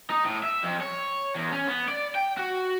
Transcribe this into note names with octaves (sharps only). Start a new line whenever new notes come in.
D#4
A2
E5
F2
C#5
E2
C#4
B3
D5
G5
F#4